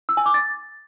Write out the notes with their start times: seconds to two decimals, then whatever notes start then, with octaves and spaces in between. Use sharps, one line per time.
0.09 E6
0.17 G#5
0.26 D6
0.34 A6